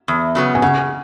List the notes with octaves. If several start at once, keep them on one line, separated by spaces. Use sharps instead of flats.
E2
C#3 F#3 B3
G#5
C#3 F#5